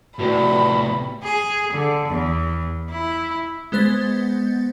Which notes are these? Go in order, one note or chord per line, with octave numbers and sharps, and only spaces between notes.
A2 C3 F#4 B4 D5 B5
G#4
D3
E2
E4
G#3 B3 C5 A6